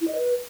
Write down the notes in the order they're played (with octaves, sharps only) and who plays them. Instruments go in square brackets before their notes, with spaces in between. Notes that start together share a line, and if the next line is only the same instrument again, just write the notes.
[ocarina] E4
D#5
B4